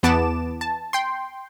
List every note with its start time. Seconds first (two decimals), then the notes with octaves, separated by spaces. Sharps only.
0.03 E2 E3 B3 A5 D6 E7
0.61 A5
0.93 G5 C6